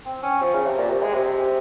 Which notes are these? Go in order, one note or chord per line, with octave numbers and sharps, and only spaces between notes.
C4
C#4
F3
C#3
C3
A#2
C3
G#3
C3